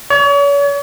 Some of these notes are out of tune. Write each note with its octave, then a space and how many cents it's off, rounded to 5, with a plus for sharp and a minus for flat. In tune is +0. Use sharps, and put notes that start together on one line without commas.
C#5 +40